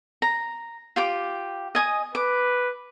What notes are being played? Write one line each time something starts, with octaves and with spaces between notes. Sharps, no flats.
A#5
F4 G4 D6
D#5 G#5 D#6
B4 D6